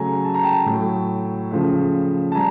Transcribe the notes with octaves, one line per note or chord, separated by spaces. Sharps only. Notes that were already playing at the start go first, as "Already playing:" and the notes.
Already playing: C#3 F#3 A3 G#5 A#5
A5
A#5
G5 A5
A2 F#3 A3
C#3 F3 A3
A5
G3 G#5 A#5